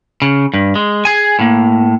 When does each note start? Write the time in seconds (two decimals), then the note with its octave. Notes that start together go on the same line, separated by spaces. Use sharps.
0.22 C#3
0.54 G2
0.76 G#3
1.05 G#4 G#5
1.39 A2 A#3